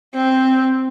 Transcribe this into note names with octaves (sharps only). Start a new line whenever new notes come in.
C4